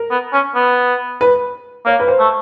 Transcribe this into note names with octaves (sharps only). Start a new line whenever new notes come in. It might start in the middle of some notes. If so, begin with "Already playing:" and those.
Already playing: A#4
B3
C#4
B3
B4
A#3 C#5
B4
C5
A3